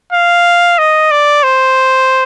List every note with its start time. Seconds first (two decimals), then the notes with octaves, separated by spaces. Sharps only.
0.13 F5
0.79 D#5
1.11 D5
1.44 C5